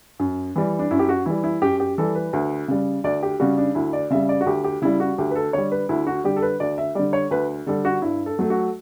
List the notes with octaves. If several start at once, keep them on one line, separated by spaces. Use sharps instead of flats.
F#2
E3 G3
D4
F#2 E4
G4
F#4
E3 G3 E4
E4
F#2 G4
G4
E3 G3 A4
B4
D2
C#3 G3
D2 D5
G4
C#3 G3 F#4
D4
D2 E4
D5
C#3 G3 E5
D5
F#4
D2 G4
G4
C#3 G3 E4
F#4
D2 G4
B4
A4
D3 G3 C#5
B4
D2 E4
F#4
D3 G3 G4
A4
B4
D2 D5
E5
D3 G3 D5
C#5
D2 B4
D3 G3 A4
F#4
G2 E4
A4
F#3 A3
F#4